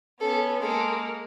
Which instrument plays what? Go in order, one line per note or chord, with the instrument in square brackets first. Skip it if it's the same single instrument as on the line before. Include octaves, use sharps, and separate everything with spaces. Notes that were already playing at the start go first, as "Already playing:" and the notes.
[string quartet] B3 C#4 [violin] A4
[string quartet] G#3 A#3 [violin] A4